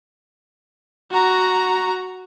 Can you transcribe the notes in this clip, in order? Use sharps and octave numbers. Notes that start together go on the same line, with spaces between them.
F#4 A#5